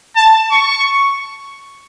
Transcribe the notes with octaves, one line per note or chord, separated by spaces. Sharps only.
A5
C#6